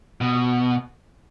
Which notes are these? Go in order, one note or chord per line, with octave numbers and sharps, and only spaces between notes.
B2